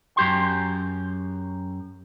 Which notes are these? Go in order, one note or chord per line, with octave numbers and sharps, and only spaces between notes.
F#2 G4 C6